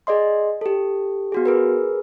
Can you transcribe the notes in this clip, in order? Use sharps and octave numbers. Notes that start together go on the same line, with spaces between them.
G#4 D5 D#5 C6
G4 A4
B3 F#4 G#4
G#4 A#4 B4